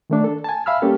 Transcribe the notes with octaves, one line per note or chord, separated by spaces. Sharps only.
D#3 A3 D4
A4
G#5 A5
E5 F5 B5 E6 F6
G3 A#3 C#4 G4 A4